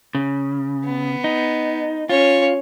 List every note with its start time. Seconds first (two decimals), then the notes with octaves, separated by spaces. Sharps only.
0.15 C#3
0.86 B3
1.24 D#4
2.09 C#4 F4 C#5